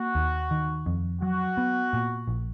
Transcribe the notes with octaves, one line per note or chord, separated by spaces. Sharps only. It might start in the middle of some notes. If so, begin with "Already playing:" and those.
Already playing: A#3 F#4
D#2
D#3
F2
F#3 F#4
B3
A#2
A#1